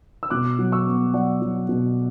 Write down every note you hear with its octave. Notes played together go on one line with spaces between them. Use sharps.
E6
B2 D6 F#6
F#3
C#6 E6
B3
F#3 D5 F#5
F#3
B2